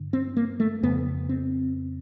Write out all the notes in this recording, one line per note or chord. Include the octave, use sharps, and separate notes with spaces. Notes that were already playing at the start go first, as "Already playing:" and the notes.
Already playing: G2 D3
C4
A#3
A3
F2 C#3 B3
C4